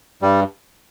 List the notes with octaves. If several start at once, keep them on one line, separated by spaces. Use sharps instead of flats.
G2 G3